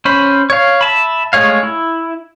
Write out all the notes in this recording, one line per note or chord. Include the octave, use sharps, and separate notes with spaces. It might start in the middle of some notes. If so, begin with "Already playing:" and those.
C#4 C5 B5
C#5 F5
E5 A5 B5
G#3 A3 G#4 C#5 F5
E4